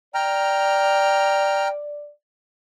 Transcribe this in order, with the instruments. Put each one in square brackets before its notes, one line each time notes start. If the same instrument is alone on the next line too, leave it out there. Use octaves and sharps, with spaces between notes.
[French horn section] D5 [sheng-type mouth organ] G5 A#5 F6